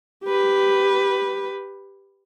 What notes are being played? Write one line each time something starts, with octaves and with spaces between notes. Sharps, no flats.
G4 B4